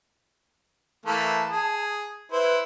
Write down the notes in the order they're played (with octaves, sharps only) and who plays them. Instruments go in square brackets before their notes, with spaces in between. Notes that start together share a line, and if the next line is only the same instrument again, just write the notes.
[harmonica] E3 A3 A#3 [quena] A5
[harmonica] G#4
[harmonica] E4 C5 [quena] B4